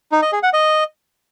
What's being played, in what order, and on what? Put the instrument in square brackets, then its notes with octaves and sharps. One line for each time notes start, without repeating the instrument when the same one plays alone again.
[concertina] D#4
D#5
G#4
F#5
D#5